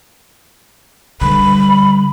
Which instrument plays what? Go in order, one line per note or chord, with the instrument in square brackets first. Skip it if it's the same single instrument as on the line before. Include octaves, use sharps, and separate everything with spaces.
[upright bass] D3 G3 [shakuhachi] B5